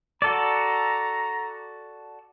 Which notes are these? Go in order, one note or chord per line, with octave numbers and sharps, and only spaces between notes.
F#4 A4 D5 A#5